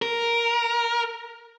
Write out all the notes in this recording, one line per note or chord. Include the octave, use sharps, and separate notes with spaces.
A#4